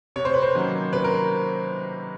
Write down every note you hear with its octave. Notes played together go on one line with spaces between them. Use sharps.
C3 C#5
C5
B4
C5
D#3 F#3 A#3 C#4
C3 B4
A#4